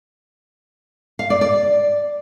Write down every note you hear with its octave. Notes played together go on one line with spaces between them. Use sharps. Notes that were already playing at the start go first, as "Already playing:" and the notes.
F5
D5
D5